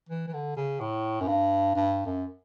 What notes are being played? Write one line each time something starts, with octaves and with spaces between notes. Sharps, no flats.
E3
E3
D3
C#3
A2
F#2
G2
G2
F#2